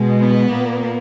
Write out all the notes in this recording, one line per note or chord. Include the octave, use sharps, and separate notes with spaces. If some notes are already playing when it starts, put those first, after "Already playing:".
Already playing: B2 G#3
B3
A#2 A#3